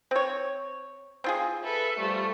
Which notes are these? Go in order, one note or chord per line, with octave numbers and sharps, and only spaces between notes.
C4 C#5
C4 F4 G#4
A4 B4 E5
F3 G3 A3